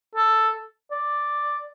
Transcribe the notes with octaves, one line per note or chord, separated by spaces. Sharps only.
A4
D5